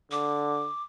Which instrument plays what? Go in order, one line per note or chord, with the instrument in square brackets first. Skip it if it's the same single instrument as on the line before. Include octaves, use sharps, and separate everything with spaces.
[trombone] D3 [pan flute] D6